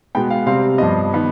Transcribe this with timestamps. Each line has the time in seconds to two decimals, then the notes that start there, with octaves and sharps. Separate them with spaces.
0.15 B2 G#3 B3 G5
0.30 F5
0.47 C3 G3 C4 F5
0.78 G2 F3 B3 D#5
1.13 D#3 B3